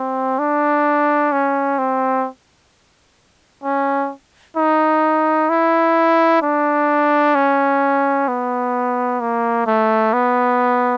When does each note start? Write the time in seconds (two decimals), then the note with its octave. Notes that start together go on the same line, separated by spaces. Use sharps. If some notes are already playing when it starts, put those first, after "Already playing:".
Already playing: C4
0.39 D4
1.32 C#4
1.79 C4
3.64 C#4
4.57 D#4
5.49 E4
6.42 D4
7.35 C#4
8.28 B3
9.21 A#3
9.67 A3
10.13 B3